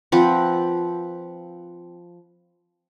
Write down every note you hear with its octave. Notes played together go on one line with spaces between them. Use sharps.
F3 C4 B4 F#5